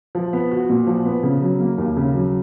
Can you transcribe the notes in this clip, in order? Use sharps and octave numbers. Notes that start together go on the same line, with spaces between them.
F3
B3
F#4
A#2
F3
B3
C#3
F#3
A#3
D#2
C#3
F#3